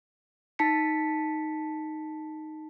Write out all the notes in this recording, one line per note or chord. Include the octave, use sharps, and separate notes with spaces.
D#4 A5 B6 C#7